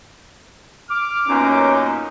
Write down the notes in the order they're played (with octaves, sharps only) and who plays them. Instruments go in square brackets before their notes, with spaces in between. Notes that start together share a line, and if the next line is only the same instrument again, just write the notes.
[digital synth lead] D6 [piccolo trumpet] F6
[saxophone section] F#2 A#2 [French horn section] B3 C#4 [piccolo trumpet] D#4